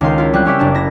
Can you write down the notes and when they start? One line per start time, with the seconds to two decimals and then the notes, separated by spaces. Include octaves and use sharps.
0.01 C#2 D#3 D#4 F5 C6
0.18 E4 F4
0.33 F#3 G3 C4 F#6
0.45 G3 C#4 G4 E5
0.59 F#1 D4 E7
0.75 E4 A#6